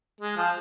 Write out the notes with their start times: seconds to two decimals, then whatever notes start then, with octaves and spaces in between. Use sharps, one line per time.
0.21 G#3
0.37 F3